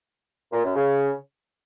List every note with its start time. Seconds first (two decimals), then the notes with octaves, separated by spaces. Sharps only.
0.53 A#2
0.64 F#2
0.76 C#3